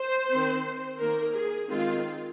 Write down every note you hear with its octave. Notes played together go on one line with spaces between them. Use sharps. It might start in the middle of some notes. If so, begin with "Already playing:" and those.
Already playing: C5
C4
D#3
D#3 A#3 A#4
G#4
D#3 G#3 C4 F4